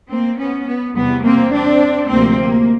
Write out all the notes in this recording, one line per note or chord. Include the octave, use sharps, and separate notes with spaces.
A#3 C4
B3 C#4
B3
E2 C3 E3 G3 B3
A#3 C4
C4 D4
D2 C3 F3 A#3 C4
A#3